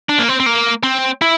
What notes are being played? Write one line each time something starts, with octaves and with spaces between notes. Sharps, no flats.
D4
A#3
C4
C4
A#3
C4
E4